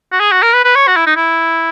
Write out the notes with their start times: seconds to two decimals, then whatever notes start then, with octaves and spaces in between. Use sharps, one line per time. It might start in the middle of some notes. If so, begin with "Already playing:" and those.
0.12 F#4
0.20 G#4
0.32 F#4
0.43 A#4
0.54 B4
0.64 B4
0.76 C#5
0.88 F#4
0.97 E4
1.07 D#4
1.16 E4